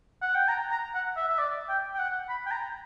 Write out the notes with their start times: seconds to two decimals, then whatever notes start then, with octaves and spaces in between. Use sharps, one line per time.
0.22 F#5
0.35 G5
0.48 A#5
0.71 A#5
0.95 F#5
1.17 E5
1.28 E5
1.38 D5
1.69 G5
1.94 G5
1.99 F#5
2.29 B5
2.46 G5
2.51 A#5